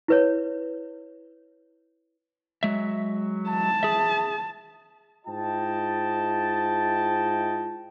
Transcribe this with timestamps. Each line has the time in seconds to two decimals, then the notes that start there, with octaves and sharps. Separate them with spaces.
0.08 E4 B4 C#5
2.63 F#3 G#3 E5
3.50 A5
3.83 G#4 E5
5.26 G#2 E4 F4 D#5 G5 A5